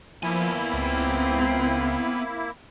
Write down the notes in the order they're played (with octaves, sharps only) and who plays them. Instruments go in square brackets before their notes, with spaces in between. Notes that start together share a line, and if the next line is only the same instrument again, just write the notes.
[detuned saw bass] F3 [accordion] A#3 E4 [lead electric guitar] B3 G#5
[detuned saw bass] C#2 [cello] C4